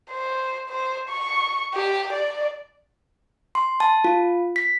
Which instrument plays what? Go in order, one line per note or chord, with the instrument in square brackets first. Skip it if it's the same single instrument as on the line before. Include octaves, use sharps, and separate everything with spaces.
[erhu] C5
C5
C#6
G4
D5
[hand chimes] C6
A5
F4
B6